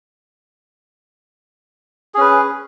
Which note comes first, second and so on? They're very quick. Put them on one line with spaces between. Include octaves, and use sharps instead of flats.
G#4 C#4 B4